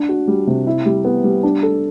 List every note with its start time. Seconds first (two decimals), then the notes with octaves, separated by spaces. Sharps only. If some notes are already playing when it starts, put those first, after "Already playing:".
Already playing: D4
0.09 F#4
0.28 G3
0.47 C3
0.67 E4
0.86 G3
1.05 B3
1.24 G3
1.43 D4
1.63 A4